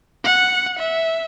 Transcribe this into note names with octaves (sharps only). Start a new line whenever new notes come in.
F#5
E5